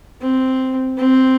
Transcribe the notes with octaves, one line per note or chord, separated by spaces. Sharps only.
C4
C4